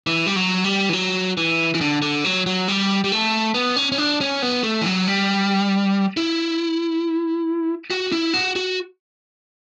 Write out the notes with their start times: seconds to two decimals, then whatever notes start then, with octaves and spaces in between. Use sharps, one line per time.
0.07 E3
0.26 G3
0.36 F#3
0.64 G3
0.89 E3
0.93 F#3
1.37 E3
1.75 E3
1.81 D3
2.02 D3
2.24 F#3
2.46 F#3
2.68 G3
3.04 G3
3.12 A3
3.54 B3
3.76 C#4
3.92 C#4
3.98 D4
4.21 C#4
4.42 B3
4.63 A3
4.81 E3
4.86 F#3
5.07 G3
6.17 E4
7.90 F#4
8.12 E4
8.34 F#4
8.56 F#4